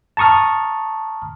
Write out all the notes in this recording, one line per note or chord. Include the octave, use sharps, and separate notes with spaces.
A5 A#5 C#6 D#6 F6